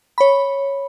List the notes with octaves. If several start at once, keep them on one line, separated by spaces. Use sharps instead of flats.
C#5 B5